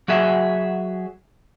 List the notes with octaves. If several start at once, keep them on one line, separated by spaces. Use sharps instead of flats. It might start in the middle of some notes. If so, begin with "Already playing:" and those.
F#3 F#4 G#4 E5